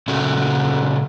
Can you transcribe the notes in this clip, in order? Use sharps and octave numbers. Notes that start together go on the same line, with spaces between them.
A#2 C#3 A3 A#3 C#4 F#4